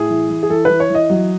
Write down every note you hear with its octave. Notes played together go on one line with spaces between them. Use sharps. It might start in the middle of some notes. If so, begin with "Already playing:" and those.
Already playing: A2 G#4
E3
E3
G#4
E3 A4
E3 B4
C#5
E3 D#5
F#3